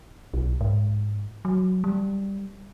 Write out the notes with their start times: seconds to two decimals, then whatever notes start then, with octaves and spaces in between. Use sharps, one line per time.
0.34 B1
0.61 G#2
1.45 F#3
1.84 G3